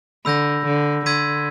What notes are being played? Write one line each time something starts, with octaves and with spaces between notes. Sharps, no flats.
D3 B5 E6 G6 A#6
D3
D3 C6 E6 G#6 B6 D#7